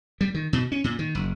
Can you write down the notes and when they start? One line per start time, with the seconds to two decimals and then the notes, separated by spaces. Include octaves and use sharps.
0.21 G3
0.34 D#3
0.53 B2
0.72 C#4
0.84 A#2
0.99 D#3
1.15 F#1